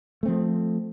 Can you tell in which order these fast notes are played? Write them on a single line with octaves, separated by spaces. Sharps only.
A3 C4 F3